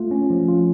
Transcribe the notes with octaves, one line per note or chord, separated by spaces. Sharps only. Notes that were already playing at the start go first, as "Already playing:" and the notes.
Already playing: A3 F4
C#4
F3
F4